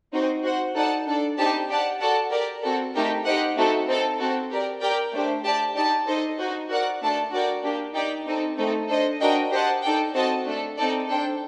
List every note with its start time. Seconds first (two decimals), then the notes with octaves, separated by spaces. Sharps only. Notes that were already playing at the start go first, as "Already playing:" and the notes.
0.13 C4 D#4 F#4 C5
0.44 F#4 C5 F#5
0.75 D#4 A4 D5 F#5 A5
1.06 D4 A4 D5
1.37 C4 D#4 G4 D5 A5
1.69 G4 D5 F#5 A5
2.00 F#4 A4 D5 F#5 A5
2.31 G4 A#4 D5
2.63 C4 F#4 A4
2.94 A3 D#4 G4 A#4
3.25 D#4 G4 C5 D#5 F#5
3.57 A3 C4 D#4 F#4 A4
3.88 C4 D#4 A4
4.20 C4 F#4 A4
4.51 G4 A#4 D5
4.82 G4 A#4 D5 G5
5.13 A3 D4 G4 C5
5.45 G4 D5 A5
5.76 D#4 G4 D5 A5
6.07 D#4 A4 C5 D#5
6.39 D#4 F#4 C5
6.70 F#4 A#4 D5 F#5
7.02 A3 D4 A4 D5 A5
7.32 F#4 A#4 D5 G5
7.64 A#3 D4 G4
7.95 D#4 G4 D5 G5
8.27 C4 D#4 A4
8.58 A3 C4 D#4 A4
8.89 D4 A4 C5 D#5
9.21 D4 F#4 A#4 D#5 G5
9.51 G4 C5 D#5 F#5 A5
9.83 D#4 A4 D5 G5
10.14 C4 F#4 A4 D#5 A5
10.46 A3 D4 A4
10.77 C4 D#4 A4 D5
11.09 D4 A4 C5 G5